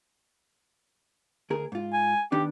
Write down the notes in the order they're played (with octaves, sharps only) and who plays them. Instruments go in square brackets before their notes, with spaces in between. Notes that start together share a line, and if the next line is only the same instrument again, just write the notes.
[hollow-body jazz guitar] D2 G#4 A#4
G#2 F4
[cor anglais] G#5
[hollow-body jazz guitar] D#3 B3 D4 [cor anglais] G4